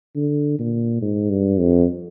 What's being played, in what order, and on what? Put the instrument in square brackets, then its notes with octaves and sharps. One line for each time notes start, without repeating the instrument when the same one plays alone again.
[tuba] D3
A#2
G#2
G2
F2